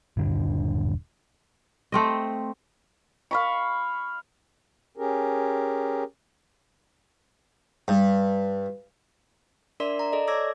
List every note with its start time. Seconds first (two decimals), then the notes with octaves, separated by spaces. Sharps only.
0.17 D#1 G2 D3 D4
1.92 A3 C4 D#5
3.31 F5 B5 C#6
4.97 C#4 G4 G#4 A#4
7.88 G2
9.80 D4 A#4 D5 E5 C6 B6
9.99 A#5
10.12 A4 D5 D#5
10.27 A4 C#5 D6 E6 G#6 A#6